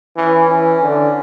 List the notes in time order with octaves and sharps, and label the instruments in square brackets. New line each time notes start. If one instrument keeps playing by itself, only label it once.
[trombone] E3 [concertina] C#4
[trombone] E3
D3